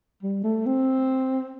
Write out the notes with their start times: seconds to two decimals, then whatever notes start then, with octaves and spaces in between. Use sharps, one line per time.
0.23 G3
0.44 A3
0.66 C4